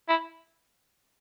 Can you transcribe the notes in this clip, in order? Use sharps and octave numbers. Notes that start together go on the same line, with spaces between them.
E4